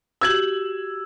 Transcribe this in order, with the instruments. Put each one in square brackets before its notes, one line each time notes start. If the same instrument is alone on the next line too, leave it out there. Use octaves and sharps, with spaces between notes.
[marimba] F#4 G4 [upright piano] E6 G#6 F#7